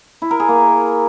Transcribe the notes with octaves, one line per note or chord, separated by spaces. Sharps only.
E4
A#4
G#4
A#3